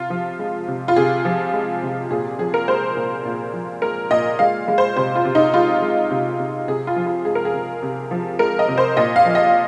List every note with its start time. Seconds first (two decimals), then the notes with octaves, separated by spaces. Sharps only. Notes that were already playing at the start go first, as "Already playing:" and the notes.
Already playing: C3 F4
0.10 F3
0.39 G#3
0.68 C3
0.88 F4
0.96 C3 G#4
1.25 F3
1.53 G#3
1.83 C3
2.11 A#2 G#4
2.39 F3 G#4
2.54 A#4
2.68 G#3 C5
2.97 A#2
3.25 A#2
3.53 F3
3.82 G#3 A#4
4.11 A#2 D#5
4.39 G#3 F5
4.68 G#3
4.78 C5
4.97 C3 C5
5.15 F4
5.25 C3
5.35 D#4
5.54 G#3 F4
5.82 G#3
6.11 C3
6.39 C3
6.68 C3 G#4
6.87 F4
6.96 F3
7.06 F4
7.25 G#3 G#4
7.35 A#4
7.45 G#4
7.54 C3
7.83 C3
8.11 F3
8.39 G#3 A#4
8.59 D#5
8.68 C3
8.78 C5
8.97 A#2 D#5
9.16 F5
9.25 F3
9.35 D#5